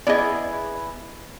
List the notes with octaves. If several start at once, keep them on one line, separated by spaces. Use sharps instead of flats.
B3 E4 G#4 D5 D#5